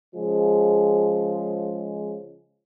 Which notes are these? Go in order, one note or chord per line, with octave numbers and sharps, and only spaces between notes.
C#3 F3 G#3